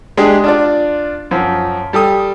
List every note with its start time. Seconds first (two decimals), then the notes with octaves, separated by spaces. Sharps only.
0.17 G#3 D4 G4 G#4
0.44 D4 F4 D5
1.31 F#2 F3
1.93 G3 A4 G5 D#6